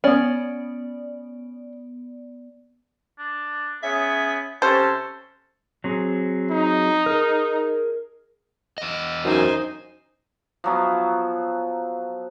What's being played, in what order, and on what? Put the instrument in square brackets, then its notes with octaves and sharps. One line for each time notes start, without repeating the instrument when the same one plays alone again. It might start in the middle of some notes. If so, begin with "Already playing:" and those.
[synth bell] B3 D5 [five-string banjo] C#4
[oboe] D4
[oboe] B3 [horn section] C#4 G#4 [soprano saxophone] E5
[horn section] C3 C#4 [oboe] A4 [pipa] C5 [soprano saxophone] A5
[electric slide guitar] F#3 C4 G#4
[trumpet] D#4
[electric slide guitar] G#4 A#4
E2 D#5
[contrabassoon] F#2 [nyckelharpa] D#4 [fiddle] C5 G#5
[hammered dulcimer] F3 F#3 B3